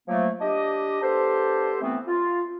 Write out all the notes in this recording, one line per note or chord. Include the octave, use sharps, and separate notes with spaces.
F3 F#3 A3 A#3
D4 G4 D#5
B3 D4 G4 A4 C5
E3 A3 B3 C4
F4